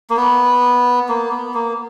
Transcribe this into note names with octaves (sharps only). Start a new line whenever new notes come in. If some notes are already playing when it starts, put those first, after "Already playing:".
A#3
B3
A#3
B3
A#3